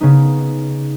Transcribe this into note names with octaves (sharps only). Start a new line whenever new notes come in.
C#3 B3 D#4